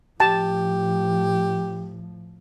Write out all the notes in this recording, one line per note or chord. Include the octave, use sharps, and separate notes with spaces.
A2 F3 G4 A5